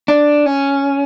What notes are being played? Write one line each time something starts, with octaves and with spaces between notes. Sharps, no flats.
D4
C#4